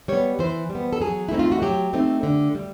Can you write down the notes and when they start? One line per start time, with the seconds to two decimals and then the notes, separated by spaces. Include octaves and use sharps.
0.08 G3 B3 C#5
0.39 E3 C5
0.70 G3
0.75 B3
0.93 A4
1.00 F#3 G#4
1.29 E4
1.31 A3 C4 D#4
1.39 F4
1.52 F#4
1.62 F#3 G4
1.93 A3 C4 D#4
2.23 D3
2.55 G3